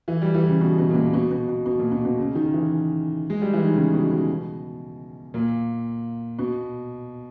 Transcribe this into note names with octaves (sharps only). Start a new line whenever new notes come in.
E3
G3
E3
C#3
B2
B2
A#2
B2
B2
B2
B2
B2
A#2
B2
B2
C#3
D#3
E3
G#3
G3
E3
D#3
C#3
B2
B2
A#2
B2